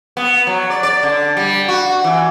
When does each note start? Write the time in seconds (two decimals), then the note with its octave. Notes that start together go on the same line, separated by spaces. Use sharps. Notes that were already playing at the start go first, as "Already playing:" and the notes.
0.17 B3
0.47 F#3
0.70 D5
0.83 D5
1.03 D3
1.37 G3
1.68 F#4
2.04 E3